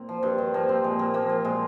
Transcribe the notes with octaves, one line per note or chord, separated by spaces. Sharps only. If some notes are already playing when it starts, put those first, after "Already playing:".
Already playing: A#2 A#3 C4
F3
G2
G2
F3 A#3
F3 C4
A#2 G#3
A#2 A#3
F3 A#3
F3
A#2 G#3